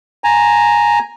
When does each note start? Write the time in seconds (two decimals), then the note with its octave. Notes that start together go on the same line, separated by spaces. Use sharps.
0.24 G#5 A#5